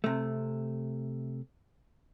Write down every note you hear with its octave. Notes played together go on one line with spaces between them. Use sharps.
C3 A3